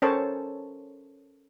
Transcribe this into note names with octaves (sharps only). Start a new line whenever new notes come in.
C#4 A4 A#4 C5 C#5 A5